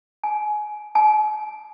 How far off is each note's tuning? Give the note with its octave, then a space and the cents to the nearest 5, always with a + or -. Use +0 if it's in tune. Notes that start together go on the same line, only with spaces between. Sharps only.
G#5 +25
G#5 +45